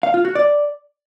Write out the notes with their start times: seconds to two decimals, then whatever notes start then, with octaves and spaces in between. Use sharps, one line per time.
0.03 F5
0.14 F4
0.25 F#4
0.35 D5